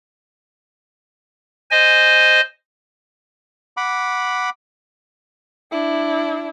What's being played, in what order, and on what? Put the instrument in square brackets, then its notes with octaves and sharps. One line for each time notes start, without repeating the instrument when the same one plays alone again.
[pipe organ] C5 D#5 G#5
[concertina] F#5 B5 D6
[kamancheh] D4 E4